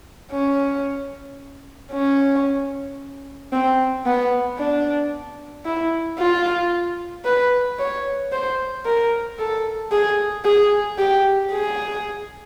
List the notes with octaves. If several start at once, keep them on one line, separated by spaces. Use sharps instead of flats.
C#4
C#4
C4
B3
D4
E4
F4
B4
C#5
C5
A#4
A4
G#4
G#4
G4
G#4